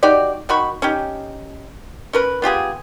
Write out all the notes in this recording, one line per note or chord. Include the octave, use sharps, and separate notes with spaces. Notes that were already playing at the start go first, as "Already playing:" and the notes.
D#4 F#4 G4 D5
D#3 F#4 B5 C#6
C#4 D#4 G4
C#4 A#4 B4
B3 F4 G4 G#4